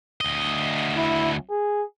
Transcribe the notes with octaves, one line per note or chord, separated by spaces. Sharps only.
D2 D#5
E4
G#4